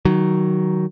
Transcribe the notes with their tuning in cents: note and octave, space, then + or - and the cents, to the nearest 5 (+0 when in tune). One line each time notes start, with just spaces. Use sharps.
D#3 +0 F#3 +10